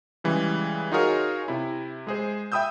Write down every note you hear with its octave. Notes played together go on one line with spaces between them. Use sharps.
C#3 E3 G3 G#3
D#4 F4 F#4 G#4 A#4 C#5
C3 E4
G#3 G#4 C5
E5 G5 B5 D#6 E6 G6